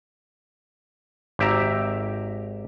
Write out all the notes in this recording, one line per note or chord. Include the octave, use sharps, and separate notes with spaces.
G#1 G4 E5 A#5